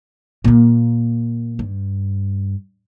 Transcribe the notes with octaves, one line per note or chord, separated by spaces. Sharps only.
A#2 A#3
G2